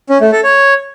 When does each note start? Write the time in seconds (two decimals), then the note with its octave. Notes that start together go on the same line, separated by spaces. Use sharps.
0.09 C#4
0.21 A3
0.32 A4
0.43 C#5